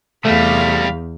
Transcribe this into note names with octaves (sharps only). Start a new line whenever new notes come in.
E2 C3 G3 A3 F5 B5